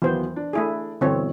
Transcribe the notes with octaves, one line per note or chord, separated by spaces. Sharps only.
D#2 E3 F#3 B3 C5
D4
A3 E4 G#4
G2 B2 D3 E3 C4 C#5